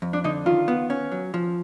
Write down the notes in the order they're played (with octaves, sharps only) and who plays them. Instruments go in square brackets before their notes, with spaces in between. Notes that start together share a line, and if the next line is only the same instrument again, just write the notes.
[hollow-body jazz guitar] F2
[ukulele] D4
[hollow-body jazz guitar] D3 [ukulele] D#4
[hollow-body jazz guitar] D#3 [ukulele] F4
[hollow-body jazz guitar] B3
C#4
F#3
F3